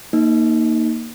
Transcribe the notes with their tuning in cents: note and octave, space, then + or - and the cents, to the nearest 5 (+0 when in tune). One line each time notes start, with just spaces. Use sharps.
A#3 +0 D#4 +5